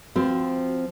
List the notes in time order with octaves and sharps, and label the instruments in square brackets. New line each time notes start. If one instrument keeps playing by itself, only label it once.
[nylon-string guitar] F3 C4 [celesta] F#4